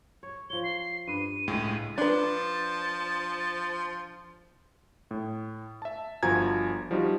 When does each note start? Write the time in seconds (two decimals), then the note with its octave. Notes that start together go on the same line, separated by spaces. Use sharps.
0.23 C#5
0.50 F3 C#5 G7
0.64 C7
1.07 G2 B4 D#7
1.47 C#2 A2 G#3
1.98 F3 D4 B4 A5
5.11 A2
5.82 E5 A5
6.23 G1 F3 F#4 G#5 A#5 G#6
6.91 F3 G3 D#4 F#4